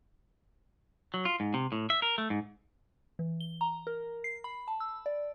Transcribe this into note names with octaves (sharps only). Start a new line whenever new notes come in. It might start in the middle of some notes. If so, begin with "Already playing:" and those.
F#3
F4
G#2
C3
A2
E5
A#4
A3
G#2
E3
G7
A#5
A#4
C7
B5
A5
E6
D5